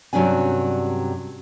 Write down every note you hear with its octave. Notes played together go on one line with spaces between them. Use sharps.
G2 C3 F#3 C#4 D4 G#5